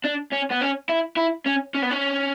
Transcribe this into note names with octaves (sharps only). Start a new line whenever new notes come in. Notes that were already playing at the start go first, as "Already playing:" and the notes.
D4
C#4
B3
C#4
E4
E4
C#4
C#4
B3
C#4